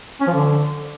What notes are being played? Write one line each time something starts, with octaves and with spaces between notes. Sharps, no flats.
C#4
F3
D3